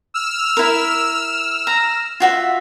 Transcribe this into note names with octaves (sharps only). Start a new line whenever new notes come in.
E6 F6
E4 A#4
A#5
F4 F#4 E5